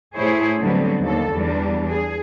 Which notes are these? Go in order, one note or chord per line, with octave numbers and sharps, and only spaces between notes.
A2 E4 G#4 C5 C#5
D3 F#3 G3 B3 C4
D#2 A4
E2 G3 D4
G#4